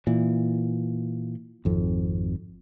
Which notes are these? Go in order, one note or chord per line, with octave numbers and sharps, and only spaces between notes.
A#2 E3
G#1 F2